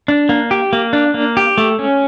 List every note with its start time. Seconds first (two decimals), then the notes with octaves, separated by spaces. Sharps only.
0.08 D4
0.29 A#3
0.51 G4
0.73 A#3
0.93 D4
1.14 A#3
1.37 G4
1.58 A3
1.79 C#4